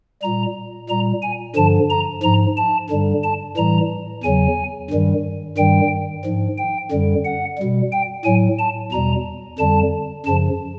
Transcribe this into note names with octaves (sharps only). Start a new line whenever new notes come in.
A#2 G3 A#5
A#2 G3 A#5
G#5
G2 D3 F3 A5
A#5
G#2 F3 A#5
A5
G2 D3 G3
A5
A2 E3 G3 A#5
E2 C#3 F#3 G#5
G2 D#3 G3
G2 D#3 G3 G5
G#2 F3
G5
F#2 D3 G3
F#5
B2 G3
G5
A2 F#3 G#5
A5
E2 B2 G3 A#5
F2 D3 G3 A5
F#2 C#3 F3 A5